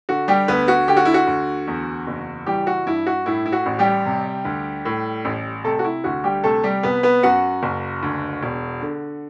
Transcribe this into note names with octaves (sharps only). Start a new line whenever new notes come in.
D3 F#4
G3 G4
D2 B3 B4
F#4
D3 G4
F#4
E4
F#4
D2
E2
F#1
E3 G3 G4
F#4
G2 E4
F#4
A2 E4
E4
F#4
A1
G3 G4
C3
D2
A2
A1
C3 A3 A4
F#4
E4
D2 F#4
G3 G4
C3 A3 A4
G3 G4
C2 B3 B4
B3 B4
F#2 F#4 F#5
F#1
D2
E1
D3